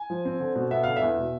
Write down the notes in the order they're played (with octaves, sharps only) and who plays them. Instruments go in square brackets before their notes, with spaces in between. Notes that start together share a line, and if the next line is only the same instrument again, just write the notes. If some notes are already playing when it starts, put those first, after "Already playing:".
Already playing: [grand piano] G#5
F3
C4
D3
B2
B3 E5
D3 F5
E5
E2
B2